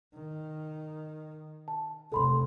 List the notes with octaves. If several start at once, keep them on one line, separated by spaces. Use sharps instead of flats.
D#3
A5
F1 A4 B5 C6